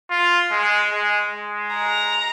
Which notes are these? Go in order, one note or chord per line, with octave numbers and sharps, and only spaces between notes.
F4
G#3
G#3
G#3
A#5